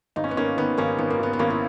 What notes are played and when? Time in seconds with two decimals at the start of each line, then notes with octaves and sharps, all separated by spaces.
0.16 G#1 D#4
0.24 C#4
0.31 B3
0.37 G#1 A#3 C#4
0.57 D#3 B3
0.78 G#1 A#3 C#4
0.98 G#1 B3
1.10 A#3
1.19 G#1 B3
1.33 B3
1.39 G#1 A#3 C#4
1.50 E4